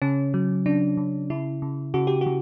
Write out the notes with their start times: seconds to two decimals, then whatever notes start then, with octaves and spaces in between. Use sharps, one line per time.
0.02 C#3 C#4
0.34 F#3
0.66 C#3 D4
0.97 C#3
1.30 C#3 E4
1.62 C#3
1.94 C#3 F#4
2.07 G4
2.21 F#4
2.26 C#3